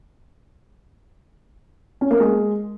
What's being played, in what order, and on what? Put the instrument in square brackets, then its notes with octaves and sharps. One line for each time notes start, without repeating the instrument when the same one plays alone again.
[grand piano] C#4
A#3
G#3